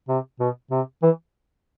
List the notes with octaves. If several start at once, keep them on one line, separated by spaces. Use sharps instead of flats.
C3
B2
C3
E3